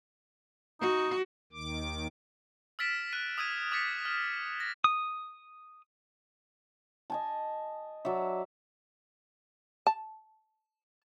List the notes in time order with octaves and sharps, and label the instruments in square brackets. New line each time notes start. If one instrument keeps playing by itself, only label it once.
[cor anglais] D#4 [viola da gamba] F#4
[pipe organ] D#2 D#3 D6
[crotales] E6 F6 A6 B6 D7 E7
F#6 B6 D#7
D#6 E6 G#6 D#7 F7
D6 E6 A6 B6 C#7
F6
A#6
[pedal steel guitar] D#6
[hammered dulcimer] D#5 G#5 A5
F#3 D5 E5
[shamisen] A5